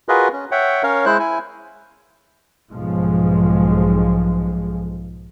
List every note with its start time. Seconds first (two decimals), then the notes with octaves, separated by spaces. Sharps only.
0.09 F4 F#4 G#4 A#4 B4 D#5
0.33 C#4
0.51 C#5 E5 F#5 G5
0.83 C#4 A#4 C#5 F5
1.06 G#3 E4 C5 F#6
1.20 E4 G#5
2.72 B1 G#2 F3 G#3